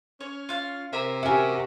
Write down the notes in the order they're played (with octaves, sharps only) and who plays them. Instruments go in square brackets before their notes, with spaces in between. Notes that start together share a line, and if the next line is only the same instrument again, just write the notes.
[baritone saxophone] C#4 [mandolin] C#5
[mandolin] F4 F5
[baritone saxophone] C3 [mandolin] E4 A#4
[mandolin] C#4 A#4 [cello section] F#4 G4 [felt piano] E5 G#5